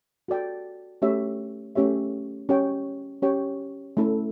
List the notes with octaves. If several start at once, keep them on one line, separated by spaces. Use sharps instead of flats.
F#4 A4 D5 G5
A3 C#4 G4 C#5 E5
A3 C#4 G4 C#5 E5
C#4 G4 C#5 G5
C#4 G4 C#5 G5
A3 C#4 E4 A4